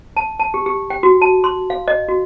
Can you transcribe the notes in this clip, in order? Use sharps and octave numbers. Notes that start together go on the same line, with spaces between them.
A5
A5
G4
G4
G5
F#4
A5
C6
F5
D#5
F#4